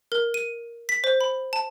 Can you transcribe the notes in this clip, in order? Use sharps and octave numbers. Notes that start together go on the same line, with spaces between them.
A#4
D#7
B6
C5
B5
A5